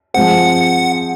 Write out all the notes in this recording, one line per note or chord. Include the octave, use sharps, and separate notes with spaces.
F3 G#3 C4 F#5